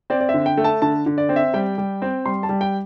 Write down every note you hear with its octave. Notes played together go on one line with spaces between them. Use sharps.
C4 D5
D5
E5
D3
G5
A3
A5
D3 A5
D3
D5
C4
E5
G3 G5
G3
C4
G3 C6
A5
G3
G5